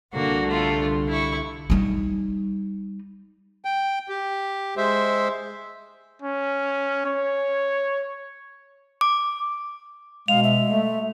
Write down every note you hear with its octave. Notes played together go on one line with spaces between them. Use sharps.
C2 D3 G3 A#3 F#4
A3 F4
E4 C#6
G3 D#4
G5
G4
G#3 C5 E5
C#4
C#5
D6
B2 G#3 F5 F7
E5
A3